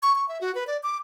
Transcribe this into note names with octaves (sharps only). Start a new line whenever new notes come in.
C#6
C#6
E5
F#4
B4
D5
D6